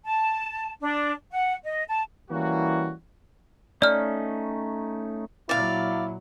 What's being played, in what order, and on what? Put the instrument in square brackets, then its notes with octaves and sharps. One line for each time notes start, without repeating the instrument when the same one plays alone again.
[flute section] A5
D4
F#5
D#5
A5
[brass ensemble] E3 G3 A#3 C#4 E4 F#4
[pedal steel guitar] A3 C#4 D#4 [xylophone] D5 F6
[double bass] A#2 F#3 [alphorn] E4 [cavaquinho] D5 F5